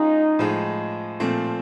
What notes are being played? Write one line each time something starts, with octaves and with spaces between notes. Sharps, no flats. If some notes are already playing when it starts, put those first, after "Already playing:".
Already playing: G#3 C#4 D#4 F4 G#4
A2 F3 G#3
A#2 F3 A3 C4